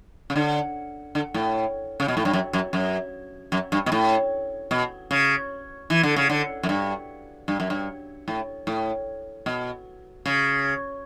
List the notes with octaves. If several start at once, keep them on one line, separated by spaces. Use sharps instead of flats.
C#3
D3
D3
A2
C#3
B2
A2
G2
F#2
F#2
F#2
F#2
G2
B2
A2
B2
C#3
E3
D3
C#3
D3
F#2
G2
G2
F#2
G2
A2
A2
B2
C#3